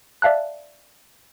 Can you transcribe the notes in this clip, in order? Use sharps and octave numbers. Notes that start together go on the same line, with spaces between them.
D5 E5 F5 A5 F#6